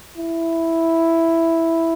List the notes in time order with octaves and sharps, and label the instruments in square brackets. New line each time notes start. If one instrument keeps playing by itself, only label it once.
[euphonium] E4